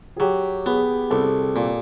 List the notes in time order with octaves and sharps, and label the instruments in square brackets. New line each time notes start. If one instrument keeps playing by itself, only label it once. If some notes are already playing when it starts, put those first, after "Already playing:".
[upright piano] G#4
[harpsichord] F#3 [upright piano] G4
[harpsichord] B3 [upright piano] G#4
[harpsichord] C2 [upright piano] A4
[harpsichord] A#2